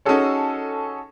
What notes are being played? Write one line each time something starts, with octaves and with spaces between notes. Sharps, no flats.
C#4 D#4 F#4 G#4 A4 C#5